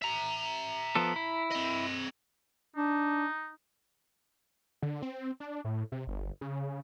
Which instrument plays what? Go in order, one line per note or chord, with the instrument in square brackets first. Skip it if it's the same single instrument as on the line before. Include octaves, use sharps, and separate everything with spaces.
[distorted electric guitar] E5 A#5
[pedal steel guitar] F3 B3 A4
E4
[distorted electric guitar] C4 D#5
[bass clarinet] D4 [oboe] D#4
[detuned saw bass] D3
C4
D4
A2
C3
G1
C#3